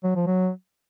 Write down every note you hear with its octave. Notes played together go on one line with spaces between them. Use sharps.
F#3
F3
F#3